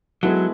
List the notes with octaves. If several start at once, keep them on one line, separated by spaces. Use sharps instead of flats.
F#3 G#3 B3 E4 A4